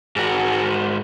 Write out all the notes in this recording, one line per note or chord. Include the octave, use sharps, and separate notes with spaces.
G#2 F#4